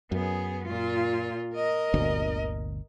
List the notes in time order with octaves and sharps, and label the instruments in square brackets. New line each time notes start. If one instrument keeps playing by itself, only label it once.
[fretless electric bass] F#2 [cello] B3 G#4
[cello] A#2 F4
A#4 D#5
[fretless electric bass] G1 D2 A#2